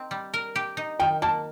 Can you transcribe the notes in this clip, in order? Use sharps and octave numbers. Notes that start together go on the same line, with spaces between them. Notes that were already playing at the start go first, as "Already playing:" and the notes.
Already playing: C4 D#4
G3
A#4
G4
D#4
D#3 G5
A#3 A5